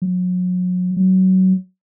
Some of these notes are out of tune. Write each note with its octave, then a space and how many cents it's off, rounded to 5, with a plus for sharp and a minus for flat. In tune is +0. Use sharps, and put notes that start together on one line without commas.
F#3 -35
F#3 +20